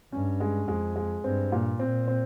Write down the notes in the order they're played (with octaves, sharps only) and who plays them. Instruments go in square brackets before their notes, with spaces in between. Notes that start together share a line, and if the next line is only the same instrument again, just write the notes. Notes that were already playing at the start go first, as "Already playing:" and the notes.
[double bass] G2 [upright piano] C#4
[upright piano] G#3
[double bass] F2 [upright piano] G#3
[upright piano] G#3
[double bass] G2 [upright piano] C4
[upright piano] A#2
[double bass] A#2 [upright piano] C4
[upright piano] C4